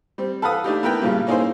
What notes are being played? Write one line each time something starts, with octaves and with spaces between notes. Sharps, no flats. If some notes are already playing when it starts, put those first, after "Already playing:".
G3 C4
A4 B4 F5 F#5 B5 D#6
A3 D4 D#4 G4
B3 E4 A#4 B4 G5 A#5
G2 A#2 C#3 F#3 G3
A#3 C#4 D#4 E4 G#4 C5